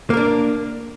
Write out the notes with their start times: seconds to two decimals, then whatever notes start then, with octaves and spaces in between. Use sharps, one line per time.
0.10 A#3
0.14 A#4
0.17 D4